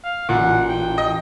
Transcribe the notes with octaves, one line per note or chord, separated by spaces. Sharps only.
F5
A1 A#2 F#5
G5
D#5